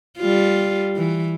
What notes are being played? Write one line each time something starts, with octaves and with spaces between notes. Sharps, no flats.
G3 F4
E3